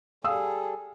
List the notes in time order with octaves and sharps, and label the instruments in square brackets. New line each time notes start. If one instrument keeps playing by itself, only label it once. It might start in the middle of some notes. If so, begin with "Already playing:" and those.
[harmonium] G3 A4 [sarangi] G#4 [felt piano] F5 D#6 E6